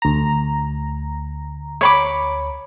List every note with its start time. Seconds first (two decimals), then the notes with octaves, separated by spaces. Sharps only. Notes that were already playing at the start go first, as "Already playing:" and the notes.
0.02 D2 A#5
1.81 C#5 B5 D6